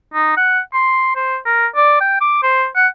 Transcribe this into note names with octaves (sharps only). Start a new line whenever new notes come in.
D#4
F#5
C6
C5
A#4
D5
G5
D6
C5
F#5